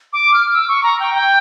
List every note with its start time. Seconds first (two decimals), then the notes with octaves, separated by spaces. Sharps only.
0.13 D6
0.34 F6
0.46 F6
0.53 E6
0.68 C#6
0.83 A#5
1.00 G5
1.14 G5